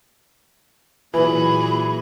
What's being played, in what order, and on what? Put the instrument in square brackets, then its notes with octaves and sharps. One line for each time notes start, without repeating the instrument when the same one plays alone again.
[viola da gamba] A#2 F#3 G#4 [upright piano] E3 [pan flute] B5